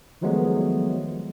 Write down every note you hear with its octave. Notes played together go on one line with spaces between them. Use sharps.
D#3 F3 F#3 G#3 A3 B3